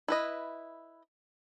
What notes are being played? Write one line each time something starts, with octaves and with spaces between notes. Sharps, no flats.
E4 B4 D#5